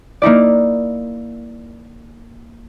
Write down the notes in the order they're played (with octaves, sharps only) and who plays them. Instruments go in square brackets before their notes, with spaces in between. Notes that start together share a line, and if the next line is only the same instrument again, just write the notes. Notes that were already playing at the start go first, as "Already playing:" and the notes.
[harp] A#3 D#4 E4 D5